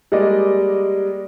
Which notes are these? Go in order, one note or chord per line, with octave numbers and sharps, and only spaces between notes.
G3 G#3 A#3 D5 D#5